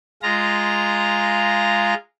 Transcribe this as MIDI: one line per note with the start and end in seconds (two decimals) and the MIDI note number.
0.22 1.94 56
0.22 1.94 65
0.22 1.94 82